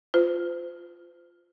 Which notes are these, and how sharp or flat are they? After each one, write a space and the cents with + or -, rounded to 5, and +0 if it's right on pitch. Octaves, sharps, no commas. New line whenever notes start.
F4 +0 C5 -35